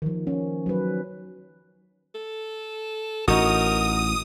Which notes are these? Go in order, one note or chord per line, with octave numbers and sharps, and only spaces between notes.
D#3 F3
C#4
F#3 B4
A4
A1 D#4 F#4 A#4 D#6